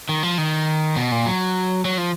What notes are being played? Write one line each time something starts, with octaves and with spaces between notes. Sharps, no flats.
D#3
F3
D#3
B2
A#2
F#3
F#3
F3